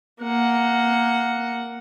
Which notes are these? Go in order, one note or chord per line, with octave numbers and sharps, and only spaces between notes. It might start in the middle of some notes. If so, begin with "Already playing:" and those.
A#3 F#5